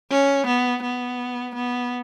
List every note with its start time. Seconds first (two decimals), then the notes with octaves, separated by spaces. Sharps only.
0.11 C#4
0.47 B3
0.83 B3
1.55 B3